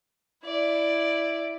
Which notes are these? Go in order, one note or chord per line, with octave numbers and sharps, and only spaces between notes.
E4 D5